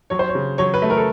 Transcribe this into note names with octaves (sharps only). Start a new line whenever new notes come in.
F#3 C#5
C5
C#5
C#3
F#3 C#5
B4
A3
A#4
A4